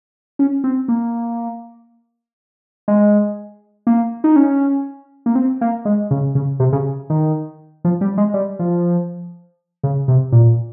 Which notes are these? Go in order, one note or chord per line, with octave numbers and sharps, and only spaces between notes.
C#4
C4
A#3
G#3
A#3
D#4
C#4
A#3
C4
A#3
G#3
C#3
C#3
C3
C#3
D#3
F3
G3
G#3
G3
F3
C#3
C3
A#2